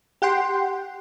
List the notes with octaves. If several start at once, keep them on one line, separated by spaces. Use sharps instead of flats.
G4 F#5 G5 C6